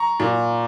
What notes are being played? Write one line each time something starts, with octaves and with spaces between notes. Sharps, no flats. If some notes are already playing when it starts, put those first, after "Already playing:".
Already playing: A#5 C#6
A#2